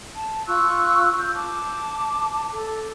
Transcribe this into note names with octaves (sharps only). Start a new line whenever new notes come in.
A5
F4 C#6 E6 F#6
G6
A5 D6
A4